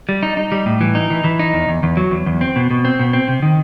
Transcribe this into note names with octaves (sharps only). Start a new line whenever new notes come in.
G3
D#4
D#4
G3
A2
E3
D#4
E3
E3
D#4
E2
E2
E2
F#3
E2
E2
C4
B2
B2
C4
B2
C4
C3
D#3